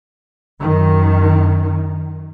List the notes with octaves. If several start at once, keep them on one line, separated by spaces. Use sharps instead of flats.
F#2 D#3